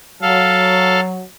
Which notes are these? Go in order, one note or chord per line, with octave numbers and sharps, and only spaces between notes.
F#3 A4 F5